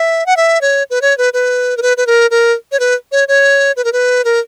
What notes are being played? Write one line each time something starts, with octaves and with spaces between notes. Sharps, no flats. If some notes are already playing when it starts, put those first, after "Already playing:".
Already playing: E5
F#5
E5
C#5
B4
C#5
B4
B4
A#4
B4
B4
A#4
A#4
C#5
B4
C#5
C#5
B4
A#4
B4
A#4